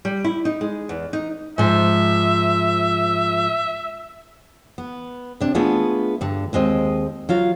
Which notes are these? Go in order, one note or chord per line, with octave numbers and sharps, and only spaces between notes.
G3
E4
D#4
G#3
E2
D#4
G#2 F3 E5
B3
C3 D4
A3 B3 D4 F4 G#4
G2 D3
D#2 G#3 C4 D#5
F#3 F4 F5